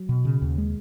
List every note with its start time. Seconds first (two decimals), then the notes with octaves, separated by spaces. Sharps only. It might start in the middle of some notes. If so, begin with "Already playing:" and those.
Already playing: F#3
0.09 B2
0.25 C#3
0.42 D#2
0.58 G#3